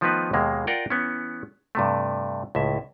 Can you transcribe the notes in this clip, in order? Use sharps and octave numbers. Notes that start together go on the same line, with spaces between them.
D#3 F3 A3 B3 D#4 B4
D#2 B2 G#3 A#3
F4 A#4 D5 F#5 G5
E3 B3 C#4
G2 C3 A3
C#2 A2 E5